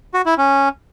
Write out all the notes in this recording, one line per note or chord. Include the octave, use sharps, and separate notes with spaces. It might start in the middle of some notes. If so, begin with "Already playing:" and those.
F#4
E4
C#4